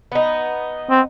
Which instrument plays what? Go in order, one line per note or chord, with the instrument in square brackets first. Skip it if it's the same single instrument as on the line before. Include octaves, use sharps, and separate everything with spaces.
[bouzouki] B3 D#4
[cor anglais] C4